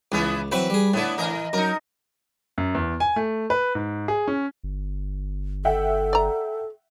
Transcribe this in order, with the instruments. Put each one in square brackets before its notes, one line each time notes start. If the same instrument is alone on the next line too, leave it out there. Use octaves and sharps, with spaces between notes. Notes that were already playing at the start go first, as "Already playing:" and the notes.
[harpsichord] C#2 [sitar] E3 B3 E4
[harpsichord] E3 F#3 C4 [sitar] B4
[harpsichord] G3 G#4
[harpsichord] A2 D3 [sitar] B3 E4
[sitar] E3 A#4 D#5
[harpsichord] F#2 [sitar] D#4 A#4
[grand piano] F#2
E2
G#5
A3
B4
G#2
G#4
C#4
[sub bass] G1
[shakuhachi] A4 [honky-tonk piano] E5 F#5 G5
[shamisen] D5 A#5